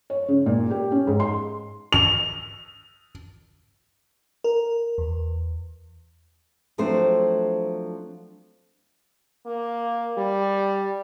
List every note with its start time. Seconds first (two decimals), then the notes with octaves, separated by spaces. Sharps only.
0.10 C#5
0.28 C#3
0.46 A#2
0.70 G4
0.92 C#4
1.07 G#2
1.20 C6
1.93 F7
4.44 A#4
4.98 E2
6.78 F3 F#3 A3 C4 D4 C5
9.46 A#3
10.18 G3